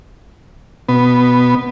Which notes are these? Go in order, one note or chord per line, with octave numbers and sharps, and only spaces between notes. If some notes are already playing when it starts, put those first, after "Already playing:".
B2 B3